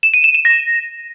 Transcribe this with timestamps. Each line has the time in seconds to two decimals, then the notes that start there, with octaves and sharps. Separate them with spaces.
0.03 E7
0.14 D#7
0.24 E7
0.35 E7
0.45 A#6